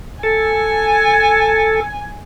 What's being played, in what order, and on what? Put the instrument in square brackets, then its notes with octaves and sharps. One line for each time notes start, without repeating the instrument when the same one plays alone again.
[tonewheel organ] A4 [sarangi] G#5